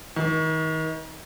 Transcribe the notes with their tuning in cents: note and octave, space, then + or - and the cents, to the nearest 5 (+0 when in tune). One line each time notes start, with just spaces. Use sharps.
D#3 +35